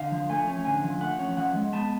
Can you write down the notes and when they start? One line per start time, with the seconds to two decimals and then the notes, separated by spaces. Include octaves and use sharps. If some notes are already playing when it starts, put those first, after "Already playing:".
Already playing: D3 F5
0.12 F3
0.29 A3 G#5
0.48 C#4
0.65 D3 G#5
0.84 F3
1.01 A3 F#5
1.19 C#4
1.37 F3 F#5
1.55 G#3
1.73 B3 A5